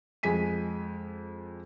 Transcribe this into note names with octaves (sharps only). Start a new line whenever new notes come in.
F2 G#3 G#5 B6 D#7